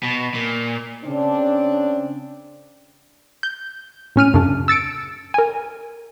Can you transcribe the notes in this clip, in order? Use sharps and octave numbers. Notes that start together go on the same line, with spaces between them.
B2
A#2
C#3 C4 D4
G6
A2 C#4 F6 D#7
F#2 C#3 D4
E6 A6 C#7 D7
A#4 G#5